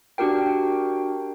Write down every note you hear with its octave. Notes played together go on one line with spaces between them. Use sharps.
D4 F#4 G4 A#4 G5